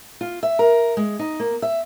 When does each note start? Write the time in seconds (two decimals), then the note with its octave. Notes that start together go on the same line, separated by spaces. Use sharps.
0.21 F4
0.43 E5
0.59 A#4
0.97 G#3
1.19 D#4
1.40 A#3
1.62 E5